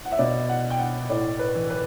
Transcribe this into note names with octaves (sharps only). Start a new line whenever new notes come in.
F#5
E5
B2 D5
F#5
G5
F#5
A2 D5
B4
E3
B4